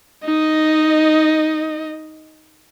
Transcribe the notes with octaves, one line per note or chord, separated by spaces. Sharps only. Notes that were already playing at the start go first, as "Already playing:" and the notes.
D#4 D#5